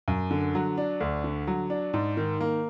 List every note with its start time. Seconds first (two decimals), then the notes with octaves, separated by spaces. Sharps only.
0.08 F#2
0.31 D3
0.55 F#3
0.78 D4
1.01 D2
1.24 D3
1.47 F#3
1.70 D4
1.94 G#2
2.17 D#3
2.41 A#3